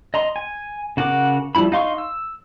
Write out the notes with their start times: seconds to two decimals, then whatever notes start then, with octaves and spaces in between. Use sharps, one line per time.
0.14 D#5 A#5 C6
0.36 G#5
0.97 C#3 F#4 A#4 F#5 D6
1.55 F3 G3 D4 E4 B5
1.72 D#4 F5 C6 C#6
1.98 E6